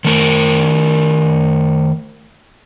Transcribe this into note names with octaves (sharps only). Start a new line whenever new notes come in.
D#3 A3 A#4